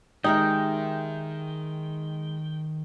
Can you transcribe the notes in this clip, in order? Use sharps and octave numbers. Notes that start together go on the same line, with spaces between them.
D#3 G#3 D#4 G4 A#4 E5 G5